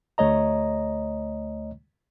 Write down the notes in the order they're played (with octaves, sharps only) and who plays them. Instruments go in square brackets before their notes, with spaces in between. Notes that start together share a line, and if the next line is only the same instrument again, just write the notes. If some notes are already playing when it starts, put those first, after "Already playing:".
[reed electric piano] D2 A3 C#5 D#5 A#5